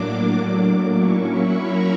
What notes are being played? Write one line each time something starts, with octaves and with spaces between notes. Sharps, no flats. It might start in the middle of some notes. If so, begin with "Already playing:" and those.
Already playing: A2 F#3 A#3 D4 D6
F#3 A#3 C#4 E4 C#6
B5
A#5